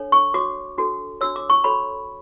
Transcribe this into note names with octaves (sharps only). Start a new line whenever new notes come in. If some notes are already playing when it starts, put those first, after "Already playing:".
Already playing: D4 A4 C#5
C#6
F#4 C#5 D6
D4 F#4 A4
D4 F#4 C#5 E6
D6
C#6
F#4 A4 C#5 B5